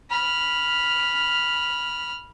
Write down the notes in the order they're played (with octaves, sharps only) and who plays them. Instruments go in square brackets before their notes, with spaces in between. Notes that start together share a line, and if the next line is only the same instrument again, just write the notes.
[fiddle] B5 F6